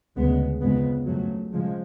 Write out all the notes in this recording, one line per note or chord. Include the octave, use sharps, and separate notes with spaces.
D2 C#3 G#3 B3
F2 C#3 G#3 B3
F2 C#3 F#3 A3
C#3 F3 G#3